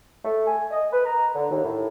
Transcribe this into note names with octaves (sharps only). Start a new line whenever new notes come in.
A3
G#5
D#5
B4
A#5
D3
D#2
A2